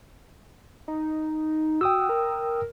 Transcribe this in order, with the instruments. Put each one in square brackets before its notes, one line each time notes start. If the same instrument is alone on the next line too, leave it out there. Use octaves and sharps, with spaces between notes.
[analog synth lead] D#4
[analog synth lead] F#4 [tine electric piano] G5 D#6 E6
[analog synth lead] A#4